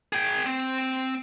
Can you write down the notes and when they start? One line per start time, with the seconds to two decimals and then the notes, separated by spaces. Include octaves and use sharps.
0.13 G#4 G5
0.46 C4